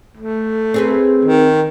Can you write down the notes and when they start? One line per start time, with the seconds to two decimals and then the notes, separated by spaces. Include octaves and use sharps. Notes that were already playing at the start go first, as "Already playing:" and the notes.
0.17 A3
0.74 C4 G#4 B4
1.25 D#3